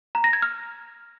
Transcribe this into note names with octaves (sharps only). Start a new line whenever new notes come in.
A#5
A#6
G#6
F6